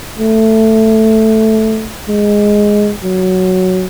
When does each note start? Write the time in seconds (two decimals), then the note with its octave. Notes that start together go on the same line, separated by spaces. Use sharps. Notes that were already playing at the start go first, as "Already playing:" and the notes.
0.19 A3
2.08 G#3
3.04 F#3